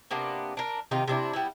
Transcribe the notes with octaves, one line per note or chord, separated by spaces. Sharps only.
C3 A#3 B3 D4
D4 A#4
C3 D#3 D#4 F4
C3 D4 E4
G3 B3 E4